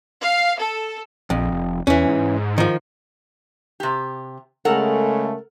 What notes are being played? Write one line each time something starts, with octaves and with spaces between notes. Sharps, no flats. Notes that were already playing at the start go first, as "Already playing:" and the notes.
F5
A4
A#1 F2
F1
E2 E3 C#4
G#2
D#3 F3
C3 G4
C#3 G#3 A3 A4 A#4 F#5